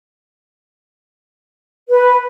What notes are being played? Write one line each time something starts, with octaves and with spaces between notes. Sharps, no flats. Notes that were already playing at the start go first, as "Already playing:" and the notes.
B4